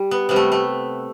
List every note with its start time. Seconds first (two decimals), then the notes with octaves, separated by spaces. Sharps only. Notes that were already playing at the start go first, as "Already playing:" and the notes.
Already playing: G3
0.11 B3
0.29 C3 G3 B3
0.36 A3
0.52 A3